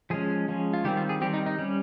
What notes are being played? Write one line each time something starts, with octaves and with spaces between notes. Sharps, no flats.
F3 G#3 C#4 G#4
F3 G#3 C#4
F4
D#3 G3 C4 G4
F4
G#4
D#3 G3 C4 G4
D#4
D#4
G3 C#4